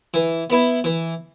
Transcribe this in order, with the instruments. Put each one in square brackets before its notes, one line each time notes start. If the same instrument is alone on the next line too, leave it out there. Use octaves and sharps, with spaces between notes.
[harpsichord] E3
B3 E4
E3